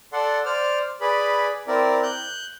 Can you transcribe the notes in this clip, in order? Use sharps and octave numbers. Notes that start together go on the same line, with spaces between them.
A4 D5 F#5 C6
C5 D5 F6
G#4 B4 D5 B5
C4 E4 A#4 D5
F#6 G6